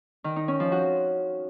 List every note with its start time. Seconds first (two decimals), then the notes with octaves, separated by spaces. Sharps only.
0.24 D#3
0.36 D#4
0.48 C#4
0.60 F3
0.72 F#4